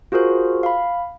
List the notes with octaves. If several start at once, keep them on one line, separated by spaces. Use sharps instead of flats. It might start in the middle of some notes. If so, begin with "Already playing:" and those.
F4 F#4 G#4 A#4 C5
F5 B5